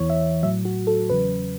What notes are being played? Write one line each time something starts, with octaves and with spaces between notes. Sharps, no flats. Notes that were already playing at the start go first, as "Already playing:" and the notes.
Already playing: E2 E3 C#5
E5
A2 F#3 E5
F#4
A4
E2 C#3 F#3 B4